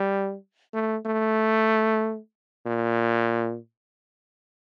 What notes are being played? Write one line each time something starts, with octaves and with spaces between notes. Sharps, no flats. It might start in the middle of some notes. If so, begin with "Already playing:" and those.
Already playing: G3
A3
A3
A#2